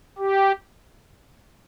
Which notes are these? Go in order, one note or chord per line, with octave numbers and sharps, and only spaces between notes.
G4